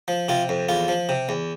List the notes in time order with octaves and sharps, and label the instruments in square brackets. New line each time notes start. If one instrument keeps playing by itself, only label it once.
[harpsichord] F3
C3 F4
F2
E2 F4
F3
C3
E2